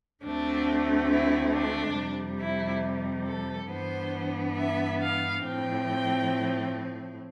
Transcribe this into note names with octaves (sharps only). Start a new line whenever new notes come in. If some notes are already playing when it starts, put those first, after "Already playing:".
D2 D3 A3 C4 D4
E4
D4
F2 C3 G3
E4
A4
G2 E3 B3 D4 C5
E5
F5
A2 F3 C4 G5